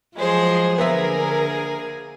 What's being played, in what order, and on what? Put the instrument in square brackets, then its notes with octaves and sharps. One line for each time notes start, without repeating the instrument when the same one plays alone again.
[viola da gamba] F3 F#3 G#4 [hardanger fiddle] G#3 C5
[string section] D3 A#4 [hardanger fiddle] A#3 G#5 [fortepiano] B3 E5 [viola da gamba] G#4